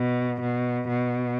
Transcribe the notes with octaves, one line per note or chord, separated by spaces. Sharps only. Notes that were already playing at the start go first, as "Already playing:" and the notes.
Already playing: B2
B2
B2